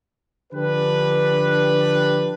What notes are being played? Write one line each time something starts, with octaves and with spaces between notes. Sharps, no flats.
D3 F3 D4 G4 B4